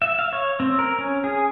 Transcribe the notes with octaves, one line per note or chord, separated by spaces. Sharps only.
E5
F5
C#5
C4
A#4
C#4
G#4